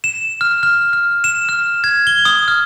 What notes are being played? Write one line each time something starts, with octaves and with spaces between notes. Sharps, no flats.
E7
F6
F6
F6
E7
F6
G#6
G7
D#6
F6